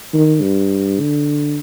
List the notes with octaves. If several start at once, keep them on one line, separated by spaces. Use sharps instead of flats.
D#3
G2
D3